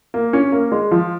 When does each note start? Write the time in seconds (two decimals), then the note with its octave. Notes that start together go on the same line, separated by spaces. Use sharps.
0.14 A#3
0.33 C#4
0.52 A#3
0.72 G#3
0.91 F3